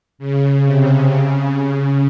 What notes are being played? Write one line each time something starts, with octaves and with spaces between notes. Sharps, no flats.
C#3
C3
C#3
C#3